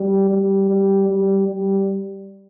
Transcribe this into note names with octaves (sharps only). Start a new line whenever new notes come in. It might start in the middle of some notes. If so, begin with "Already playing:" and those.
Already playing: G3
G3
G3
G3
G3